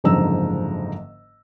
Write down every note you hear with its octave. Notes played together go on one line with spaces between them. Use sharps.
F#1 G#2 D3 F3 A#5 E6